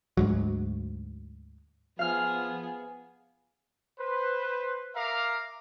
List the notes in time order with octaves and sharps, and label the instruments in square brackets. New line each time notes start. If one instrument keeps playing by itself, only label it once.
[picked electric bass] D2 G#2 F#3
[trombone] F3 [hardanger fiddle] B3 G#4 [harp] F5 F6
[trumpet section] B4 C5
A#4 E5 F5 A#5 D6